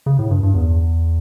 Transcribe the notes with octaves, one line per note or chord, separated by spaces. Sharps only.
C#3
A2
G2
G2
E2